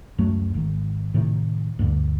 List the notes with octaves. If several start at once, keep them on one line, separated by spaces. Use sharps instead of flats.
C#2 F#2 F#3 A3
G#1 D#3
A2 C3 D#3
D2 G2 D3